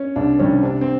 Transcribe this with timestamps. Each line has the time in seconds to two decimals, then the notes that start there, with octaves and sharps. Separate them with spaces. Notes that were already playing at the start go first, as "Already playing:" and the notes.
Already playing: C#4
0.16 C2 D4
0.39 C3 D#3 G3 C#4
0.63 C3 D4
0.81 C4